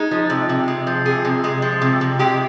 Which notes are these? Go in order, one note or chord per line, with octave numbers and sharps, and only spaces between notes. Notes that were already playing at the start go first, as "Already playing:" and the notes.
Already playing: G#3 D#4
F3
C3
C3
G#3
F3
C3 G#4
C3
G#3
F3
C3
C3
G#3 G4